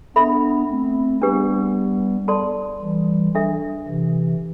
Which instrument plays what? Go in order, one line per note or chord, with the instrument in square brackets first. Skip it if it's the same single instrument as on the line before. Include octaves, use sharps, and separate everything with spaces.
[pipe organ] B3 D4 [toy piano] A4 E5 B5
[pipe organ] A3 C4
[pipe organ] G3 B3 [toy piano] D4 G4 B4
[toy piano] A4 D5 A5 C6
[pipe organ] E3 G3
[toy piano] D4 A4 E5
[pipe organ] C3 E3